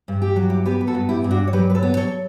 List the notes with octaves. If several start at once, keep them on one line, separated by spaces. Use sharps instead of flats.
G2
G4
F#3 F#4
E4 G4
B3 G4 B4
B4
F#4 A4
G2
E4 G4
G2
D4 F#4
C#5
F#3 G4 B4
B4
A4 C#5
B3
A4 C#5